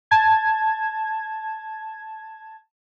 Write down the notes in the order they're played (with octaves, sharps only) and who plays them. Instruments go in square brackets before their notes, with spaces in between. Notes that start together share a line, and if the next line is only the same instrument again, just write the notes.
[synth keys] A5 G#6